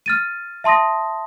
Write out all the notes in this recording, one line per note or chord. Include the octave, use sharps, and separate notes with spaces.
F6 A6 D#7
E5 A5 C6 D#6 A#6